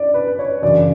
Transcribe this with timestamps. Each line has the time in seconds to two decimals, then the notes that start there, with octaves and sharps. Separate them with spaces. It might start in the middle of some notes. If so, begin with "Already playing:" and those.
Already playing: D5
0.14 B4
0.39 C#5
0.62 F#2 C#3 E3 D5